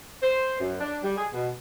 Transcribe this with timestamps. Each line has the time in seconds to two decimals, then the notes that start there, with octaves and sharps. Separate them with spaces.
0.23 C5
0.60 F#2
0.81 D4
1.04 G3
1.18 G#4
1.33 B2